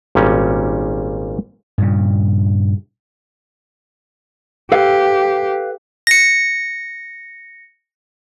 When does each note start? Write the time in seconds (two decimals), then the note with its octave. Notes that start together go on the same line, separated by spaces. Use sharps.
0.15 G#1 A#2 G3 C#4
1.78 G2 A#2 C#3
4.72 G4 A4 B4 F5
6.07 A#6 C#7